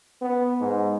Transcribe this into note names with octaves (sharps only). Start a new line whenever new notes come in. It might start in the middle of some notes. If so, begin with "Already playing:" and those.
B3
G#2